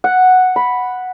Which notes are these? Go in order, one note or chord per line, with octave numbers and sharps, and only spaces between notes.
F#5
B5